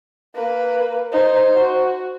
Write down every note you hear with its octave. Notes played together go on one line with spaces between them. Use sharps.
A#3 B4
D#4 C5
F#4